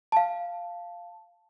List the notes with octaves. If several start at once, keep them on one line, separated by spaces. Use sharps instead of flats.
F5 A5